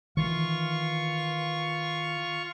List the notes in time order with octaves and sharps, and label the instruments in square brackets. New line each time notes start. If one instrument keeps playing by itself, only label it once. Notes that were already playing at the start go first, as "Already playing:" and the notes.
[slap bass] D#3 E3 [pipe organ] F4 C#6